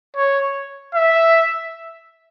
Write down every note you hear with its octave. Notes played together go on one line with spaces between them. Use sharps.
C#5
E5